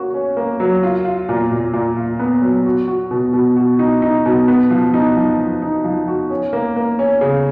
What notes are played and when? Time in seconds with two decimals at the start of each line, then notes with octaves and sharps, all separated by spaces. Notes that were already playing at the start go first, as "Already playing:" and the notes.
Already playing: A#3 C#4 F#4
0.14 C#4
0.37 A#3
0.60 F#3
0.83 F4
1.05 F4
1.29 A#2
1.52 A#2
1.73 A#2
1.97 F4
2.19 B3
2.42 F#3
2.66 F#4
2.88 F#4
3.11 B2
3.33 B2
3.56 F#4
3.79 D#4
4.02 D#4
4.26 B2
4.48 B3
4.71 F3
4.94 D#4
5.17 F3
5.39 F3
5.62 D#4
5.84 F3
6.08 F#4
6.30 C#4
6.53 A#3
6.76 A#3
6.99 C#4
7.21 C#3